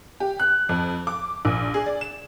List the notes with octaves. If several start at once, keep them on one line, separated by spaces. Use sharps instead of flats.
G4
F#6
F2
D6
A#1
G#4
D5
E7